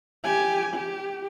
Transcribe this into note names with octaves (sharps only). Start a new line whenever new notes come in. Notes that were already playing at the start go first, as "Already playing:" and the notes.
G4 G#5
G4